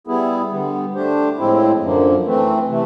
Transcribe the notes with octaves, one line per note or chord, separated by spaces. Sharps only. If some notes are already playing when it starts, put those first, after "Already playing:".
G3 B3 E4 G#4
D3 G3 B3
A3 D4 G4 C5
A2 F3 G#3 C4 E4
F#2 D3 F3 A#3
E3 A3 C4
C3 E3 A3